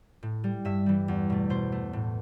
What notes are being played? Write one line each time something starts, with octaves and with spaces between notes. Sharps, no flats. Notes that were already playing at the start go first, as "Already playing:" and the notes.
A2
G3
G2 E5
E3 G3
E2
B2 A3
B2 C5
A3
A2